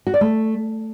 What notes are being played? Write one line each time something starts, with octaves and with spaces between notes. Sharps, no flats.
F#4
D5
A3